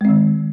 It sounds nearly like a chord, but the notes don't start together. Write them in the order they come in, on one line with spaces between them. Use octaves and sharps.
G#3 C4 D#3